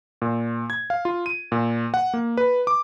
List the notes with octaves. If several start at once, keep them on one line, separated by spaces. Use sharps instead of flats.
A#2
G#6
F5
F4
D#7
A#2
F#5
A#3
B4
D6